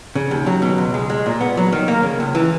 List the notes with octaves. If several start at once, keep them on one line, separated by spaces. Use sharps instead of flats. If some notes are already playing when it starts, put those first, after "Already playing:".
C#3
D#2
F#3
B2
C#2
G#3
G#3
A#2
B3
F#3
D#3
A#3
C#3
C#2
E3